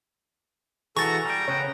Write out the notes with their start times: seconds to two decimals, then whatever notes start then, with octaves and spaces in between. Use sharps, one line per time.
0.97 E3 F#4 G#4 A4 A#5 C#6 A6
1.25 G3 G5 A#5
1.48 C#3 B3 C#5 G5